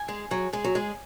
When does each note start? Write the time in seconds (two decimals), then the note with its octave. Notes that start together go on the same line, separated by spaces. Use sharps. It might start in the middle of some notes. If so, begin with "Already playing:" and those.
Already playing: G#5
0.08 G#3 G#4
0.31 F#3 G#4
0.53 G#3 G#4
0.64 F#3
0.75 G#3 G#4